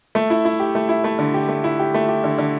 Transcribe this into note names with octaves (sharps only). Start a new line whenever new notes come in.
A3
E4
E4
G4
A3
E4
A3
D3
G4
A3
E4
G4
A3
G4
D3
D3